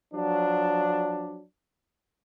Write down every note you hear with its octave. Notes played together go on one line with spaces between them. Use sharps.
F3 F#3 D4